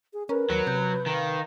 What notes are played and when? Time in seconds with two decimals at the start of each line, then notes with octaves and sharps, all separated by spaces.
0.13 G#4
0.29 C#4 A#4 B4
0.50 D#2 F#3
0.67 C3 G6
1.06 D#3 F5